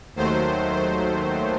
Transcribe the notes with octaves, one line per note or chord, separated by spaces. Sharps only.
D#2 D#3 F#3 A3 C5
C5